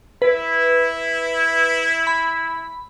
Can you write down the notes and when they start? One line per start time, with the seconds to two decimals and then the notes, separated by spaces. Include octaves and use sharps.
0.22 E4 B4
2.07 B5